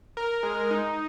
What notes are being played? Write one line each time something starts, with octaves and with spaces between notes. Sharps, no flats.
A#4
G#3
D#4